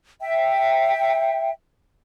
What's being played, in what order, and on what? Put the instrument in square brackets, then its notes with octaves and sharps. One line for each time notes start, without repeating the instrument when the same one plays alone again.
[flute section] E5 G5